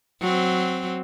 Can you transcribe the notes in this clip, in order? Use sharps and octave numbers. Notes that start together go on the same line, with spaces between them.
F#3 C4